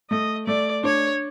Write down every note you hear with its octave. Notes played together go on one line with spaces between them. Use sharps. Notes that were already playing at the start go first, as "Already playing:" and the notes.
A3 D#5
A3 D5
D4 C#5